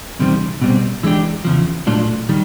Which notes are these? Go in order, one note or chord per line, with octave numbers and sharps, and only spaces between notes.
E2 C3 D#3 G3 C4
B2 G3 C4
E3 G#3 B3 D4 G4
E2 C#3 F3
A#2 F#3 A3 D4 F4
D#3 G3